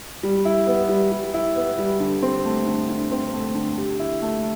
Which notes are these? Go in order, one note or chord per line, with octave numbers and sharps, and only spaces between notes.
G3
E4
B3
G3
G3
E4
B3
G3
D3
C4
A3
D3
D3
C4
A3
D3
G4
E4
A3